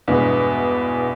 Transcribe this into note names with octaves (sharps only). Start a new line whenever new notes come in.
E2 G2 B2 G#3